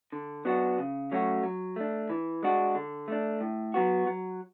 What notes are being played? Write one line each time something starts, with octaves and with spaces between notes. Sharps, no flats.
D3
F#3 B3 D4 F#4
C#3
F#3 A3 C#4 F#4
F#3
A3 D4
E3
G#3 D4 F#4
D3
A3 D4
A2
F#3 B3 F#4
F#3